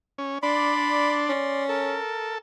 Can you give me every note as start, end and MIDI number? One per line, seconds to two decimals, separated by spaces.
0.18 0.38 61
0.43 1.32 62
0.43 1.64 74
0.43 1.22 83
0.43 1.64 84
1.29 1.98 61
1.69 2.38 69
1.69 2.35 70